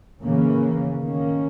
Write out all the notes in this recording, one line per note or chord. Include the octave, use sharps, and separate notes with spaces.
C#3 E3 A#3 C#4
D#3 A#3 C#4